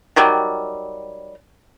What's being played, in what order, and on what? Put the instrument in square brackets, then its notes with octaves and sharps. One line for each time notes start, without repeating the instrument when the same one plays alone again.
[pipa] D#3 F#3 G3